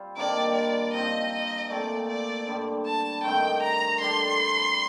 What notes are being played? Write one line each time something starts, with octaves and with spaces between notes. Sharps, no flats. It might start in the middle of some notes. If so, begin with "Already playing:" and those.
Already playing: G3 C4 F4
C3 D#3 A#3 D4 D5
D5
G2 F3 C4 D#4 D#5
D#5
A#2 A3 C4 D5
D5
G2 D3 G3
A5
G2 D#3 A3 C4 G5
A#5
D3 G3 D4 C6